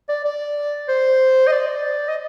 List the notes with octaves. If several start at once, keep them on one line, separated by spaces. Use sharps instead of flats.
D5
D5
C5
D#5
D5
D#5